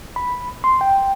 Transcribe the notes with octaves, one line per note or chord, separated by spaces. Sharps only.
B5
C6
G5